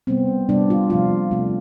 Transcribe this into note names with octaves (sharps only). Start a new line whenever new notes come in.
C3 G3 B3 C4
C3 G3 B3 D4
F4
C3 F3 A3 F4
C3 F3 A3